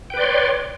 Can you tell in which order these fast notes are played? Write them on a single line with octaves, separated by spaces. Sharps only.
G5 B4 D5 C6 C#5